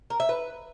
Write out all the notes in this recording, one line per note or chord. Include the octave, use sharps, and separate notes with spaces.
A#4
E5
B4